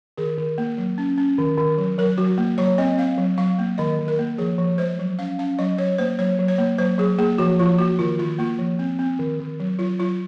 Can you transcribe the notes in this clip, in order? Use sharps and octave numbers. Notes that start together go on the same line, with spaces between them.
D#3 G#4
D#3
A#3
F#3
C#4
C#4
D#3
D#3
F#3
F#3 A#4
F#3 F#4
A#3
F#3 C#5
C4 D#5
C4 F5
F#3
F#3 F5
A#3
D#3 D#5
D#3
A#4
A#3
F3 G#4
F3
G#3 C5
F#3
C#4 F5
C#4 F5
F#3 D#5
F#3 C#5
A#3 C5
F#3 C#5
F#3
C#5
A#3
F#3 C5
F#3 G#4
A#3 G#4
F3 F#4
F3 F4
A#3 F#4
D#3 F4
D#3 F4
A#3 F4
F3
C4
C4
D#3
D#3
F#3
F#3 F4
F#3 F4